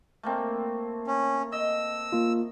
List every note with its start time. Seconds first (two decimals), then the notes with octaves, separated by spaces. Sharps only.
0.23 A3 A#3 C4
1.07 C#4
1.52 D#5 E6
2.12 A#3 F4